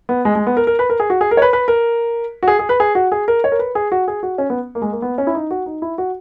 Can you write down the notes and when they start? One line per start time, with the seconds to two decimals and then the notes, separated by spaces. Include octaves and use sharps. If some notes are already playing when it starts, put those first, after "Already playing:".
0.09 B3
0.25 G#3
0.35 G#3
0.47 B3
0.57 A#4
0.67 A#4
0.79 B4
0.90 A#4
1.00 G#4
1.10 F#4
1.21 G#4
1.31 A#4
1.37 C#5
1.42 B4
1.53 B4
1.68 A#4
2.43 F#4
2.48 G#4
2.59 G#4
2.69 B4
2.80 G#4
2.95 F#4
3.12 G#4
3.28 A#4
3.44 C#5
3.52 A#4
3.59 B4
3.75 G#4
3.92 F#4
4.08 G#4
4.23 F#4
4.38 C#4
4.50 B3
4.75 A#3
4.82 G#3
4.92 A#3
5.02 B3
5.18 C#4
5.27 E4
5.35 D#4
5.51 F#4
5.66 D#4
5.82 E4
5.98 F#4